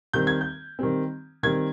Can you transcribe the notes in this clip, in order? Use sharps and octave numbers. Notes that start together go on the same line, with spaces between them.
D#3 G3 C4 G6
G#6
G6
D#3 G3 C4
D#3 G3 C4 G#6